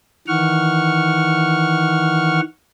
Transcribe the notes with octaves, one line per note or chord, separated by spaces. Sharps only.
D#3 E3 F#5 C#6 F6